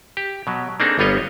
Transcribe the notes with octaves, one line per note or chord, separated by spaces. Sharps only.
G4
B2 F#3
A#3 C4 D4 D#4 G#4 A4
G1 G3 B3 F4 C#5 D#5